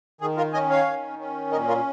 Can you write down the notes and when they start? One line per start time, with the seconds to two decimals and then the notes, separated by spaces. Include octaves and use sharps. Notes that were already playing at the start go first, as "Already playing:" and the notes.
0.21 D#3 G#4
0.37 F4 A#4
0.53 C#4 D#5 G#5
0.70 C#5 F5
0.86 D#3
1.19 C#4
1.52 A#2 A#4 D#5
1.68 F4 A#4